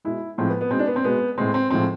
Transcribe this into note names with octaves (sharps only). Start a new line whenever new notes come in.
B2 G#3 E4
A2 F3 G#3 C4
B3
B3
B2 G#3 C4
D4
B3
C4
B2 G#3 B3
A2 G#3 C4
C4
A2 F3 G#3 C4